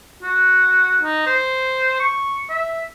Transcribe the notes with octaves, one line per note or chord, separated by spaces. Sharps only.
F#4
D#4
C5
C#6
E5